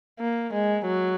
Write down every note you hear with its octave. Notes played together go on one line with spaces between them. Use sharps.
A#3
G#3
F#3